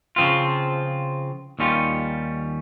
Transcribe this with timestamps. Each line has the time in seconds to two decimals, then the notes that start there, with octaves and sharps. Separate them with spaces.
0.16 C#3 F3 C4 F4
1.59 D#2 D#3 G3 C#4 F4